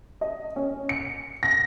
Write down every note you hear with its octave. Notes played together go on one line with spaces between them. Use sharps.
D#5
C#4
C#7
A#6